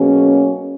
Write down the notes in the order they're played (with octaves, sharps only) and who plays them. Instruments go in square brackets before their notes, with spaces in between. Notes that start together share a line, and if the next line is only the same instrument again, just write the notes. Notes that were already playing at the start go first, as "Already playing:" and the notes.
Already playing: [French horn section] B2 F#3 A#3 C#4 G#4